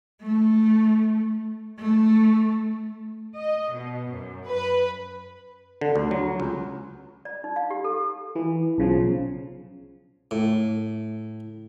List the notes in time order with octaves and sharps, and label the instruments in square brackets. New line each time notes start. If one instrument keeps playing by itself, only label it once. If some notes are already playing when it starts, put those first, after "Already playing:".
[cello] A3
A3
[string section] D#5
B2
F#2
B4
[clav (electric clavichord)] D3
D2
F#3
C#2
[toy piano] D5
D#4
F5
G4
A4
[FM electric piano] E3
B1 C#3 F3
[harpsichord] A2